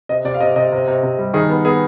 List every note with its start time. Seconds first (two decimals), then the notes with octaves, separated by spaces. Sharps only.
0.09 C3 D#5
0.25 C3 D5
0.34 F5
0.40 C3 D#5
0.56 C3 D#5
0.72 C3
0.87 C3
1.03 C3
1.18 G3
1.34 D#3 G#4
1.49 B3
1.65 B3 G#4